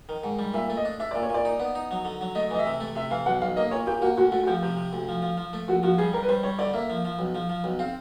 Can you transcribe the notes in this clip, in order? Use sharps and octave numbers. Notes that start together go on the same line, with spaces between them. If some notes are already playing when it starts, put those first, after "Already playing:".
D#3
G#2
G3
A#2 E5
A3
D#5
D4
D4 E5
D5
A#2
C#5
A#2 D5
D#4
B3
D#4
F#3
D3
F#3
A3 D#5
E3 D#5
E5
C3
A3
C3 E5
E3 F5
B1 F#5
B1 F5
A#3 D#5
A#2 C#5
A#2 G4
A#3 F#4
D2 F#4
A3 F#4
F#4
F3 G4
C3 G4
C3
D2
F3
F3
F3
A3
A#1 F#4
F3 F#4
G3 G#4
G3 A#4
B4
G3 C5
G3 C#5
D3 D5
A#3 E5
F3
F3
B1
F3
F3
B1
C4 F5